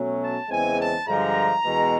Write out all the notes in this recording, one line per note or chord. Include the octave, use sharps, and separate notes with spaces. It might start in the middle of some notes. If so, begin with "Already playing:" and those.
Already playing: B2 F#3 A3 C#4
A5
E2 C#3 E3 G#3 C4 G#5
A5
G2 D3 F3 G#3 A#5
E2 B2 G#3